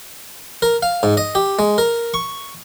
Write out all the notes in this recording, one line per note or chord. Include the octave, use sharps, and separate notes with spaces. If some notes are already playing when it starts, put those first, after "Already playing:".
A#4
F5
G#2
D#5
G4
G#3
A#4
C#6